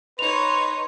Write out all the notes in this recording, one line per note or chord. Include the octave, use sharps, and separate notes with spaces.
D#4 B4 C#5 C6 F7